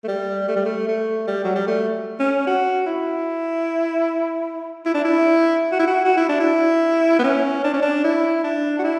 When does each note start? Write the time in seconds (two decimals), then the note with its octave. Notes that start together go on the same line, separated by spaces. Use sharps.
0.04 A3
0.08 G3
0.48 A3
0.56 G3
0.65 A3
0.88 A3
1.27 G3
1.44 F#3
1.55 G3
1.67 A3
2.20 C#4
2.47 F#4
2.86 E4
4.85 E4
4.94 D4
5.04 E4
5.72 F#4
5.79 E4
5.87 F#4
6.04 F#4
6.17 E4
6.29 D4
6.40 E4
7.19 B3
7.24 C#4
7.64 D4
7.73 C#4
7.82 D4
8.04 E4
8.44 D4
8.79 F#4
8.83 E4